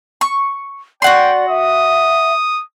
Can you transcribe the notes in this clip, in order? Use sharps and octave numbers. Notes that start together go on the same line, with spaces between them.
C#6
F#4 D5 F#5 G5 C6
E5 D#6